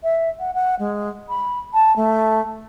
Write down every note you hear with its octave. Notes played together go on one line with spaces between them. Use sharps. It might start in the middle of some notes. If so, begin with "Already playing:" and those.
E5
F#5
F#5
G#3
B5
A5
A3